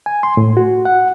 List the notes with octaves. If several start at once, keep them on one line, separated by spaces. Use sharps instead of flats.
G#5
C6
A2
F#4
F#5